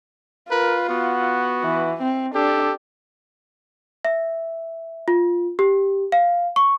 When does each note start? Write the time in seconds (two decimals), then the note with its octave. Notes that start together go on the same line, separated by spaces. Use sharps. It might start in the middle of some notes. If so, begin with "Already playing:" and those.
0.51 F4 A#4 B4
0.89 B3 F#4
1.64 E3
2.02 C4
2.35 D4 G4 A4
4.05 E5
5.08 F4
5.59 G4
6.12 F5
6.56 C#6